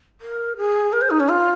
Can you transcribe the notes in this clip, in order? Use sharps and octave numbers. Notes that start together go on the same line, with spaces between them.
A#4
G#4
A#4
C5
D#4
C#4
F4